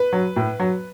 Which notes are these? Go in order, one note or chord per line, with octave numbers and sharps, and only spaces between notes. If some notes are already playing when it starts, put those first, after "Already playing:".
Already playing: B4
F#3
A2
F#3